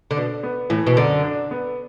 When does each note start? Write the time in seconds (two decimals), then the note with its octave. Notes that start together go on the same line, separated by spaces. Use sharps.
0.11 D3
0.17 B2 D4
0.43 B3
0.70 A2 E3
0.87 B2
0.97 F#2 D3
1.24 D4
1.51 B3